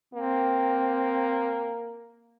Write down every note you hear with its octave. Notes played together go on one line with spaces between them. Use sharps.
A#3 C4